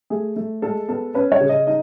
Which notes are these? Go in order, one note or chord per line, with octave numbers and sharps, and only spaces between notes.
A3 G#4
A3
G#3 A4
B3 A4
C#4 B4
C#5
C#3
D#5
D#4 D#5